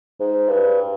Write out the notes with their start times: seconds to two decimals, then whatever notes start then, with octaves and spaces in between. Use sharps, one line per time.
0.20 G#2
0.49 G2